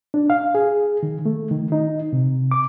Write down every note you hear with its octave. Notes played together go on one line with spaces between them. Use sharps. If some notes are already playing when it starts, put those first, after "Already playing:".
D4
F5
G#4
D#3
A3
D#3
D#4
C3
D6